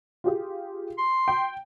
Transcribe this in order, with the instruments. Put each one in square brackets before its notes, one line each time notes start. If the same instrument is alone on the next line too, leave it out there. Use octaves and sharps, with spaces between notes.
[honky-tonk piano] F4 G4 G#4
[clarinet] C6
[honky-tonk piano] G5